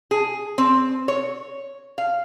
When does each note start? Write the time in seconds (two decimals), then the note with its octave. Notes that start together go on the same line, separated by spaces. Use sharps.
0.11 G#4
0.58 C4
1.08 C#5
1.98 F5